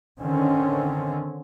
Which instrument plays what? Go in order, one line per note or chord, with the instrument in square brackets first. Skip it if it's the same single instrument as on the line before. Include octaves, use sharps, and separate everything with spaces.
[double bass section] D3 D#3 C4 C#4